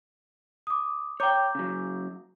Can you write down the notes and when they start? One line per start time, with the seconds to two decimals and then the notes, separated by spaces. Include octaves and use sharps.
0.67 D6 D#6
1.20 C#5 G5 A#5 D6 G6
1.55 C#3 F#3